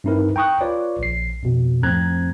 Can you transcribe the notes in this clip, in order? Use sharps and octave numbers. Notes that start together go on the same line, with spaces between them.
G2 C4 D#4 E4 A#4 B4
G5 A#5 C#6 D#6 F#6
F4 B4 C#5 D5
A#1 C7
F2 B2
F2 A2 C4 A#5 F#6 G#6